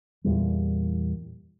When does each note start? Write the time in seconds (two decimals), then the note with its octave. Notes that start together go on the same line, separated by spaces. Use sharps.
0.24 E2 A#2 E3 G3